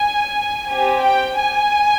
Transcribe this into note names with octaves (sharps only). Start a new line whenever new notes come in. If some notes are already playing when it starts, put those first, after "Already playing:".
Already playing: G#5
C4 G4 G#5
G5
G#5